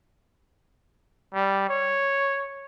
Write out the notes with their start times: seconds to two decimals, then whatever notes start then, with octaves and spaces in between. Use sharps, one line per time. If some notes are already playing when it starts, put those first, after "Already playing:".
1.34 G3
1.69 C#5